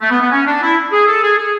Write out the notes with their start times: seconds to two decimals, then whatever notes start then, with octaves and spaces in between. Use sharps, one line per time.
0.01 A3
0.11 B3
0.21 B3
0.31 C#4
0.46 D4
0.62 E4
0.92 G#4
1.07 A4
1.23 G#4
1.38 G#4